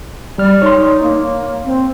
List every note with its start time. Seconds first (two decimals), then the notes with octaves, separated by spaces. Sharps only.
0.38 G3 D5 F6
0.62 D#4 C#5 C6
1.03 A#3
1.65 C4